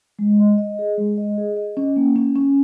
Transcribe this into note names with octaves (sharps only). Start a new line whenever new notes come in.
G#3
D#5
D#5
G#4
G#3
D#5
G#4
D#5
C#4
A#3
C#4
C#4